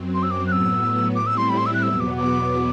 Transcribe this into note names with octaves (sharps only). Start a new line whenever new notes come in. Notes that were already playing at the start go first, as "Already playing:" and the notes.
Already playing: F#2 F#3 C4
C6
E6
D6
A2 F#3 B3 E6 F#6
A2 G3 C4 E4 D6
E6
C6
B5
C6
E6
F#6
E2 B2 F#3 B3 E6
D6
D6